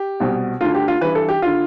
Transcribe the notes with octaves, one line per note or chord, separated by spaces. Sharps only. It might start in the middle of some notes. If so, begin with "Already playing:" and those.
Already playing: G4
C2 B2
D2 D3 F4
G4
F4
G2 E3 B4
A4
G4
D3 F4